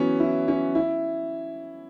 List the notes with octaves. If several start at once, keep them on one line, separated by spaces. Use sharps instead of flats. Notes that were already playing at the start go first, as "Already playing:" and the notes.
Already playing: E3 F#3 B3 C#4
E4
C#4
E4